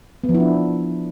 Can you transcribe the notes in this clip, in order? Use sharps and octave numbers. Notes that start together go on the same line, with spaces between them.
B3
F3
E4
D4